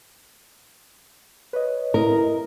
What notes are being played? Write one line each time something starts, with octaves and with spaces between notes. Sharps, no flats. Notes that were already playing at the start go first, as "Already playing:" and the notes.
B4 C#5 D#5
E4 A#4 D#5 A#5